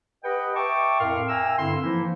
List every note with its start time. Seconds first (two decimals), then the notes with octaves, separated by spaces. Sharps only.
0.24 G4 B4 D#5 F#5 G5
0.56 E5 G5 A5 C#6 D6
1.00 F2 A2 A#4 F5 C6 F6
1.29 E5 G5 G#5 A#5 E6
1.58 G2 D3 C4 E4 F5 C6
1.82 E3 F3 A#3 D#4 E4